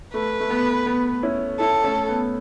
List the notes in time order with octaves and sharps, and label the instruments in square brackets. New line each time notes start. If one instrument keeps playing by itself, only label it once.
[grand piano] A3 [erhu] B4
[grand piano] A3
B3
B3
C#4 E4
[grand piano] C#4 E4 [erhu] A4
[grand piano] A3 C#4
B3